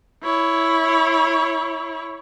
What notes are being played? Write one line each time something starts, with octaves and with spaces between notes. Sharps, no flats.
E4 C#5